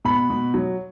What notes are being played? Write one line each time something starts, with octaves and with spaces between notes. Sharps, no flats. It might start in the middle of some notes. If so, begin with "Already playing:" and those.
B2 B5
B2
F#3